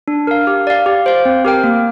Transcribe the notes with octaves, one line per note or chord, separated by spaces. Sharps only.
D4
A#4 F5
G4
D5 F5
G4
C5 F5
C4
G4 A#4 G5
A#3